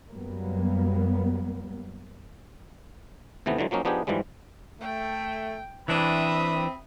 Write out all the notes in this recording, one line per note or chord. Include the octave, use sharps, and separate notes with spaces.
F#2 F#3 G3 A#3 B3
D#2 C3 E3 A3 B3
D3 E3 F#3 G#3
F3 F#3 A#3 C#4 D#4
F3 B3 D4 D#4 G4 G#4
G#2 E3 F3 G3 G#3
A3 G5
E3 C4 D4 E5 B5 D#6